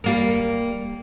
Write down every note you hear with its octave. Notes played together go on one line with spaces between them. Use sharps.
G3 A#3 A#4